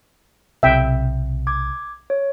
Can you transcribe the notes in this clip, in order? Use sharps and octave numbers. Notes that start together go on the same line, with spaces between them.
B1 C3 E5 G5
D6 G#6
C#5